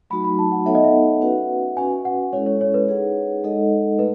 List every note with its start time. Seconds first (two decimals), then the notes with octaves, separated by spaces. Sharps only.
0.10 F#3 A3 D#4 F#4 B5
0.24 B5
0.39 A5
0.52 F#5
0.66 B3 D#4 A4 C#5 E5 F#5
0.75 D#5
0.84 E5
1.21 C#4 F#4 B4 F#5
1.77 C#4 F#4 B4 G#5
2.05 F#5
2.32 G#3 C#4 E4 A4 C#5
2.46 C#5
2.61 C#5
2.74 B4
2.89 D#4 G#4 C#5 F#5
3.44 G#3 D#4 A4 D#5 F#5
3.99 A3 B4